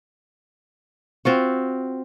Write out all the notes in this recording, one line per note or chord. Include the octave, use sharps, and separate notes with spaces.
C4 F4 F#4